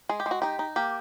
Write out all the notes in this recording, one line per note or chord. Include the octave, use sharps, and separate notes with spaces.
G#3 G#4
G4
G#3
F#4
D#4 G4
D#4
A#3 G4